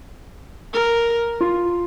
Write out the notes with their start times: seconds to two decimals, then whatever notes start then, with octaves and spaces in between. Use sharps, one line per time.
0.73 A#4
1.41 F4